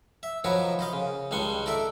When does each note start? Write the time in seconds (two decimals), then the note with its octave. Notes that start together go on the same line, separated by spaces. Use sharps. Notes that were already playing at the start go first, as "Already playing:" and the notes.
0.23 E5
0.44 D#3 F3 F#3 A#4 B4 C#5
0.79 C5 D#5 F5
0.93 C#3
1.31 C#2 D#3 G3 D4 C6 C#6
1.66 A4 A#4 D5 E5